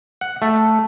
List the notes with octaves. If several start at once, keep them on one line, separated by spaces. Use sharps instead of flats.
F#5
A3